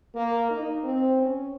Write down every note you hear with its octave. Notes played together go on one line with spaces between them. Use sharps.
A#3
D#4
C4
C#4